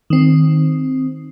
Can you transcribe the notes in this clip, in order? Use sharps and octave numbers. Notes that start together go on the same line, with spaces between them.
D#3 C4